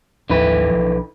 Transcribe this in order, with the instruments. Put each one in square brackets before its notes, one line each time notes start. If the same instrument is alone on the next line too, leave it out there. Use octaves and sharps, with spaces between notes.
[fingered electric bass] A1 D#2 F3 [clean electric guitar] D3 E3 B4
[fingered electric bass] B1 F3